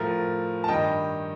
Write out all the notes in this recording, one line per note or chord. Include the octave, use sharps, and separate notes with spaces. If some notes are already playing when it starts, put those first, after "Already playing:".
Already playing: A2 F3 A3 A#4
A5
G2 D#3 G3 D#5 G5